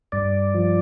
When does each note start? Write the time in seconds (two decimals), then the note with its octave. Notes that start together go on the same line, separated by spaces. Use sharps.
0.12 G2 D5
0.54 F3